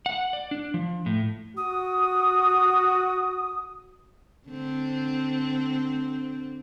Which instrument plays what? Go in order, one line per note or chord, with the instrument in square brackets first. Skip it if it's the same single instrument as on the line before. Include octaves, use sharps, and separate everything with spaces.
[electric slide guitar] F#5
D5
D4
F3
A2
[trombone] F#4 [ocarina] D#6
[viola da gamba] D3 C4